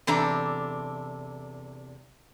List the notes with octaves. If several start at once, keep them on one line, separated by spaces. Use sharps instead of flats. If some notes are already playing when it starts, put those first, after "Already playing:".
E2 C3 D4 A4 A#5